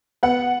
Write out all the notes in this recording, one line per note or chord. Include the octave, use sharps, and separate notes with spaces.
B3 F#5